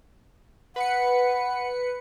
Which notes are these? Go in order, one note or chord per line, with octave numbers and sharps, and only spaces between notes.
B4 F#5 B5 C#7